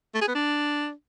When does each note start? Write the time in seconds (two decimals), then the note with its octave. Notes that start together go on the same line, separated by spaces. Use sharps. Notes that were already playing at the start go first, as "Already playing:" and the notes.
0.14 A3
0.21 G#4
0.28 B3
0.35 D4